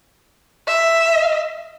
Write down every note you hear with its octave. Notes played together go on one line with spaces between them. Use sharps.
E5